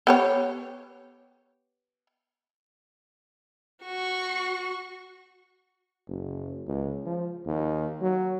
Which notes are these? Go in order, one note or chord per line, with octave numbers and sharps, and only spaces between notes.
B3 G4 C#5
F#4 C#6
F#1
C#2
F3
D#2
F#3